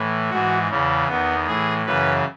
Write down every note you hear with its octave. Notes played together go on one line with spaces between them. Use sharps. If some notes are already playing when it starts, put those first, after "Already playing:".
Already playing: A2 E3
G#2 E3 F#4
E2 C#3 E3
E2 D#3 B3
A2 E3 G#4
F#2 C#3 E3 B4